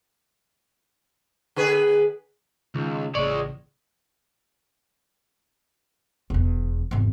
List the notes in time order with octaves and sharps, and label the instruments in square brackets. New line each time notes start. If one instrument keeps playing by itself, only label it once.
[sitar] D3 G#4 B4
[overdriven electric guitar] C#2 [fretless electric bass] D#3
[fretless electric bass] A1 C#3 A#3 [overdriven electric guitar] G#3 C#5 [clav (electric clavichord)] D5
[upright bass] E1 E2
G#1 E2